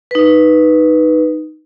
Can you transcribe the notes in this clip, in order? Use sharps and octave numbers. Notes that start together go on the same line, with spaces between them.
D#4 B4